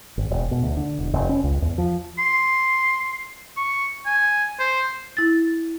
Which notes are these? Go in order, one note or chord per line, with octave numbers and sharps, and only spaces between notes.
G#1
E1
B2
D2
D3
E1
F1
C#4
C#2
E2
F3
C6
C#6
G#5
C5
E4 A6